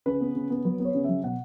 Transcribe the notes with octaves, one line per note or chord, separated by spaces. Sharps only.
C#3 B4
B3
C#3
B3
F#3 B4
B3 C#5
C#3
F#3 E5
B2 F#5